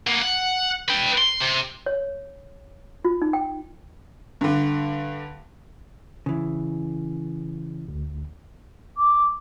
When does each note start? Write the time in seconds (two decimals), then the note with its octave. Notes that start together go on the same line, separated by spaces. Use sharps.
0.07 A#3 B3
0.22 F#5
0.89 B4 G5
1.18 C6
1.40 C3
1.86 C#5
3.05 F4
3.22 D#4
3.33 G5
4.41 G2 D3
6.26 C#3 E3
7.88 D2
8.98 D6